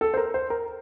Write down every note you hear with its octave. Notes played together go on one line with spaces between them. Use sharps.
A4
C5
A#4
C5
A#4